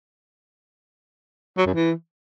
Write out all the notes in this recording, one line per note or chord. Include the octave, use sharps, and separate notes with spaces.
F#3
F#2
E3